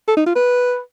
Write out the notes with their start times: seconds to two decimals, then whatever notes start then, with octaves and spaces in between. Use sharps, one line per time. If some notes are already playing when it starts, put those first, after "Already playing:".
0.08 A4
0.17 D#4
0.26 F4
0.35 B4